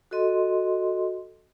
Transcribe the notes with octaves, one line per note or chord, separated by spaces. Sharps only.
F#4 A4 D#5 C6